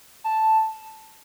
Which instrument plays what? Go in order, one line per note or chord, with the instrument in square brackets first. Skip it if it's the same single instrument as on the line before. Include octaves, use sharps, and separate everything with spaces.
[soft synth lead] A5